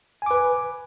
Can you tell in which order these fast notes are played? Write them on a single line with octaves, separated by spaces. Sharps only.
G#5 D6 B4